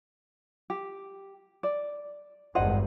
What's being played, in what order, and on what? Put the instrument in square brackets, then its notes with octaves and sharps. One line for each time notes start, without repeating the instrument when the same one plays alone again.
[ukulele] G4
D5
[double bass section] G#1 E2 G2 [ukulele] C5 D#5 F#5